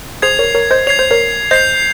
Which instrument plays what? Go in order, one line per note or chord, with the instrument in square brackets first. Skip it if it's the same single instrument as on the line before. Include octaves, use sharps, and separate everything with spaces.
[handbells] G#4 C5 [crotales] G#6 C7 F7
[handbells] A#4 C#5
A#4 C#5
C5 D#5
[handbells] C#5 [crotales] G#6 C7 F7
[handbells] C5
A#4 C#5
[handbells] C5 D#5 [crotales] G6 C7 F7